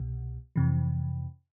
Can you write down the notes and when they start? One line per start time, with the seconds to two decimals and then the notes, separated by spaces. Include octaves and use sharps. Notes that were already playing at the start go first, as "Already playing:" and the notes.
Already playing: C2 B2
0.56 F2 C3 E3